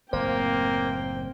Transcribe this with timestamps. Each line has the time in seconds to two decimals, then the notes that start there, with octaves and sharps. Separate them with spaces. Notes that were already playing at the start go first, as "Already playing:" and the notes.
0.13 F#1 A2 A#3 C4 C5 G5